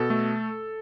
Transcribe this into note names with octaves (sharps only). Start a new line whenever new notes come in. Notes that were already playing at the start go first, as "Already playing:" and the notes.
Already playing: B2 A4
A3